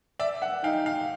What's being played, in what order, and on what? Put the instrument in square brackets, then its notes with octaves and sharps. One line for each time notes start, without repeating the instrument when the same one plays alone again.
[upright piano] D5 E5
E5 F#5
[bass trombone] D#4 [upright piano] F5 G5
[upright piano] F5 G5